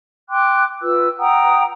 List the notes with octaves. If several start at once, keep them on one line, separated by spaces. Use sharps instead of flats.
G5 C6 D6 F#6
F4 B4 E6
F#5 G5 A#5 D#6